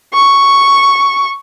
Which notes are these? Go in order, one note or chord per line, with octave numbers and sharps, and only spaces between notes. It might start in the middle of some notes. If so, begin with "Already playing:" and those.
C#6